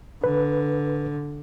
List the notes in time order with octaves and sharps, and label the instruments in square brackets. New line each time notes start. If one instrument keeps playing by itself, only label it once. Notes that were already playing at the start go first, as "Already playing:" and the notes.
[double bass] D3 [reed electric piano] B4